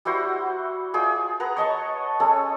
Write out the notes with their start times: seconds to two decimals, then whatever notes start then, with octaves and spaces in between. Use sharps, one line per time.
0.05 G3 E4 F#4 C5
0.94 F4 G#4 D5 G5
1.40 B4 F#5 A#5
1.56 C#5 D#5 A5 C#6
2.20 G#3 C#4 A4